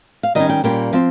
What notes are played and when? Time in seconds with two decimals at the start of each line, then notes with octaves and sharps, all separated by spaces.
0.23 F5
0.35 D#3 G3 C#4 D#5
0.49 G5
0.64 A#2 G3 A#3 C#4 G5
0.93 F3 C4